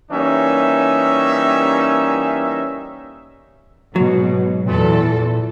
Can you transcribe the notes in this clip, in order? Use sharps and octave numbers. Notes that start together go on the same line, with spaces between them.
E3 G3 A#3 C#4 D#4 E5
G#2 B2 F#3
E2 A#2 E3 A4